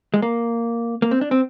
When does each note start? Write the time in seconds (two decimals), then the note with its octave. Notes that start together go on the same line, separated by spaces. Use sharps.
0.14 G#3
0.22 A#3
1.02 A#3
1.11 C4
1.21 D4
1.31 C4